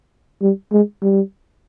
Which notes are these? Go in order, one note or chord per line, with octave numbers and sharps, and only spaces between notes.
G3
G#3
G3